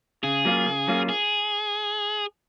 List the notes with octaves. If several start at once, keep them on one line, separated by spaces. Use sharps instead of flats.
C#3 G#4
F#3 A#3 C#4 F4
C#3
F#3 A#3 C#4 F4
G#4